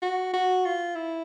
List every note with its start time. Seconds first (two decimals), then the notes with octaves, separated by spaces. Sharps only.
0.02 F#4
0.33 F#4
0.65 F4
0.95 E4